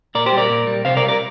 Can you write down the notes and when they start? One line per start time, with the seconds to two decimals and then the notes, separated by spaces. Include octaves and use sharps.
0.15 A#2 A#4 D5
0.26 G4 C5
0.32 G3
0.38 A#4 D5
0.50 A#2
0.67 G3
0.85 C3 C5 F5
0.97 A#4 D5
1.02 G3
1.08 A#4 D5